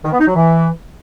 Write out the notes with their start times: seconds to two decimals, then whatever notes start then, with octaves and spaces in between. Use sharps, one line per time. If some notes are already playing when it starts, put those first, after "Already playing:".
0.04 D#3
0.12 B3
0.20 D#4
0.28 F#3
0.35 E3